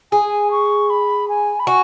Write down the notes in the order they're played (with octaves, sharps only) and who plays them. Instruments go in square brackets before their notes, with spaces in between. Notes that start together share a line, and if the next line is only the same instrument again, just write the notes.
[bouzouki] G#4 [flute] G#5
[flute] C#6
B5
G#5
B5
[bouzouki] F#4 [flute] G#5